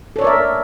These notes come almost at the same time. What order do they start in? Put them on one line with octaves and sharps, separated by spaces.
A4 C#5 D5 A#4 E5